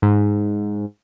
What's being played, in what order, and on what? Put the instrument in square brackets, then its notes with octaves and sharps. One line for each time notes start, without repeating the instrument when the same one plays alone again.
[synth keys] G#2